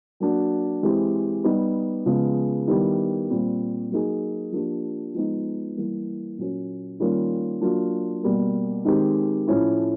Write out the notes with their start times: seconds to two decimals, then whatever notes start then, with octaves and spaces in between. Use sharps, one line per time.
0.20 F#3 A#3 D4 F#4
0.83 E3 G#3 C4 E4 G4
1.44 G3 B3 D#4
2.06 C#3 F3 G#3 B3
2.68 D#3 G3 B3 E4 G4
3.30 A#2 G3 C4
3.91 F#3 A#3 D#4 G#4
4.52 F3 A#3 D4 G4
5.14 F3 G#3 B3 D#4
5.77 E3 G3 A#3
6.38 A#2 F#3 A#3 C#4
7.00 D#3 G3 A#3 C#4 F4
7.61 F#3 A#3 D4 F4
8.23 B2 G3 A#3
8.85 D#3 G#3 C4 D#4 G4
9.47 A2 F3 A3 C#4 E4